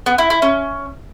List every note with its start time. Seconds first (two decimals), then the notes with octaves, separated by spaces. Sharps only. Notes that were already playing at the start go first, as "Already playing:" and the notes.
0.06 B3
0.18 E4
0.30 E4
0.42 C#4